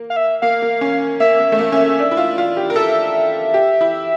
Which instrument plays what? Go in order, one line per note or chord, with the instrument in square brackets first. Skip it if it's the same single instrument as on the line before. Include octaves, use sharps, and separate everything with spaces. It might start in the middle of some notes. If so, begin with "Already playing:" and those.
Already playing: [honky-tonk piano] A#3
[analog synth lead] F5
E5
[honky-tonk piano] A#3 [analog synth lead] F5
[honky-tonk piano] A#3
C#4
[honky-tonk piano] A#3 [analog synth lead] E5
[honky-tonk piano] A#3
A3
A#3
C#4
A#3
D4
E4
F4
F4
G4
A#4
[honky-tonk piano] A4 [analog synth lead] E5
[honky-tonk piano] G4
E4